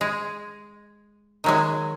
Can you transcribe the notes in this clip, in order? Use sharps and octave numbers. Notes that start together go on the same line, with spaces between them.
G#3
D#3 F#3 G#3